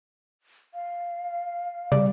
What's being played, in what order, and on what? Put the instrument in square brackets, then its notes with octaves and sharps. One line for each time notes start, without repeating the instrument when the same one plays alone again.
[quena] F5
[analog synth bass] C#3 [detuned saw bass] G3 [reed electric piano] D5